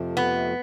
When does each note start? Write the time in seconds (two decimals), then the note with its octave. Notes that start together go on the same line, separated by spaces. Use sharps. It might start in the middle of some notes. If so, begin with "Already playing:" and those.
Already playing: F2 C3 F3 A3
0.17 B3